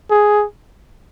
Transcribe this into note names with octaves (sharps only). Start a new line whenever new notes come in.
G#4